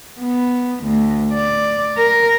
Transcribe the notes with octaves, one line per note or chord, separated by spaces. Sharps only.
B3
D2
D5
A#4